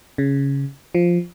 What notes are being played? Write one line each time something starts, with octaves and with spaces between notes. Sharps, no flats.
C#3
F3